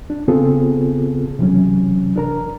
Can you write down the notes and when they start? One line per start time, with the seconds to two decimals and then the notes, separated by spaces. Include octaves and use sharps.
0.10 D4
0.28 C#3 B3 C4 F4 G#4 A4
1.39 C3 E3 F#3 C#4
2.16 D4 A#4 A#5